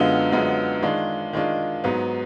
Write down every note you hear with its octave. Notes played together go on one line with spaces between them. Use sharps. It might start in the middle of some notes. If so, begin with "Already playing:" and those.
Already playing: F#2 D3 G#3 B3 F4
F#2 D3 G#3 B3 F4
D#3 G#3 D4 F4
D#3 G#3 D4 F4
G#2 F#3 B3